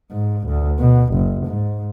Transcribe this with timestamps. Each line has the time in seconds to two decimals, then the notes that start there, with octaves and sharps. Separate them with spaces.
0.11 G#2
0.47 D2
0.79 B2
1.14 F#1
1.47 G#2